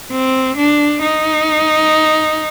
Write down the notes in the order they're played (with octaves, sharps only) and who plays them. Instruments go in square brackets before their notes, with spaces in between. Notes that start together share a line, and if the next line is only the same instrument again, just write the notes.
[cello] C4
D4
D#4